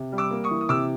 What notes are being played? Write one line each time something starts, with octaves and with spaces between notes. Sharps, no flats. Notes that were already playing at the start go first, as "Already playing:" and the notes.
Already playing: C3
G3
D6 E6
A#3
C#6 D#6
E3
D#6
C3 D6 E6